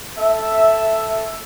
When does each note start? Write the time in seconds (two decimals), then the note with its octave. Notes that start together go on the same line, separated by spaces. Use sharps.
0.19 A4 E5